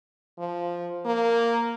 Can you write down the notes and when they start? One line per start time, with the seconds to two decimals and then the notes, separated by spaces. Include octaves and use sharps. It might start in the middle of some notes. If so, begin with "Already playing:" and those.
0.39 F3
1.06 A#3